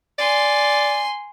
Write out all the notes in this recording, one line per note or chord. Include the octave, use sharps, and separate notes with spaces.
D5 G#5 C6